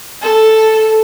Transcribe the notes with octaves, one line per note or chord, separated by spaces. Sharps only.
A4